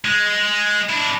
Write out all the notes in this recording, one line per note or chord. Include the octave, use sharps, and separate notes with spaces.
G#3
D4 E4